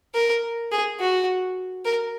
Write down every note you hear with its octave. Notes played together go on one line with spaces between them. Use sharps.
A#4
G#4
F#4
A#4